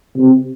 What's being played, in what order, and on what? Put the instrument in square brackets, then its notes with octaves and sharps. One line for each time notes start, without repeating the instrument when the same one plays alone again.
[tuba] C3